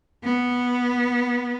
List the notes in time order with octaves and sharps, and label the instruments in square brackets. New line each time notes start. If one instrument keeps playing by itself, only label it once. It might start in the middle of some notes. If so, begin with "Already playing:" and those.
[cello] B3